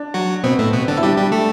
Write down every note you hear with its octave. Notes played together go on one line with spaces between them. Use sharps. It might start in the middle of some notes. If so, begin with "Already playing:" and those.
Already playing: D4
F#3 F#4
B2 B3 C4
A2 A3
B2 B3
D3 D4
E4
G3 D4 G4
G3 G4
A3 A4